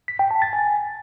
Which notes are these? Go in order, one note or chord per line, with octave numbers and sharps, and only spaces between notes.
B6
G5
A5
A6
G#5